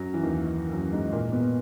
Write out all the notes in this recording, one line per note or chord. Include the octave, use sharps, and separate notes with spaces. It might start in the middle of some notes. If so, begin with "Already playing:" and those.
Already playing: F#2 F#3
E3
D#2 D#3
F#2 F#3
G#2 G#3
A#2 A#3
B2 B3